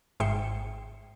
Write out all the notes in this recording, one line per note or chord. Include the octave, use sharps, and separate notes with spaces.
G#1 G#2 E5 G5 C7 C#7